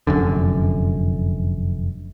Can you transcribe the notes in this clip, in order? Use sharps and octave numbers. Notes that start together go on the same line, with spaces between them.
F1 F#2 D3